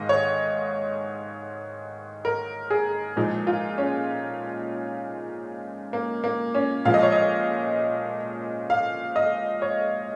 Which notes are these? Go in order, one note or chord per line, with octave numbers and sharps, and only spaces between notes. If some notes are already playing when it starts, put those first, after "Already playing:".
Already playing: G#2 D#3 G#3 D#5 F5
C#5
A#4
G#4
A#2 F3 G#3 D#4
F4
C#4
A#3
A#3
C#4
A#2 F3 G#3 F5
D#5
C#5
D#5
F5
D#5
C#5